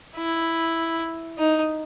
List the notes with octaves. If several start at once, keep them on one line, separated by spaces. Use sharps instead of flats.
E4
D#4